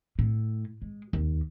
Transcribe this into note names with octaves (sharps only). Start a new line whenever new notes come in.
A2
G#3
D#2